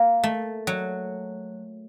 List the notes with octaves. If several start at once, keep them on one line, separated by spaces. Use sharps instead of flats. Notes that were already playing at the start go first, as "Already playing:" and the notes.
Already playing: A#3
A3
F#3